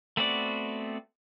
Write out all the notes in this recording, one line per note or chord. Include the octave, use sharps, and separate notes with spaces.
A3 B3 C4 F#4 D5